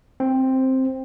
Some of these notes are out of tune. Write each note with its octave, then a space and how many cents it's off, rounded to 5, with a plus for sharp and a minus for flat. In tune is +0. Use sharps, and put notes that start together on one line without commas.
C4 +5